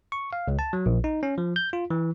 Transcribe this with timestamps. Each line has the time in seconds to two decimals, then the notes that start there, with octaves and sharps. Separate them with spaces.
0.12 C#6
0.33 F5
0.48 C#2
0.59 A5
0.73 F#3
0.86 A#1
1.04 D#4
1.23 C#4
1.38 F3
1.56 G6
1.73 F4
1.90 E3